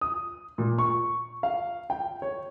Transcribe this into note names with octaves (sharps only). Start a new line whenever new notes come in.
D#6
A#2
C#6
F5
G5
C#5